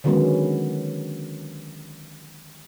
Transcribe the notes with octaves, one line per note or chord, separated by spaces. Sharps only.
D3 D#3 F#3 G#3 B3 C#4